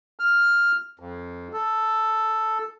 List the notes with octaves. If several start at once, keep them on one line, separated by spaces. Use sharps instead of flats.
F6
F2
A4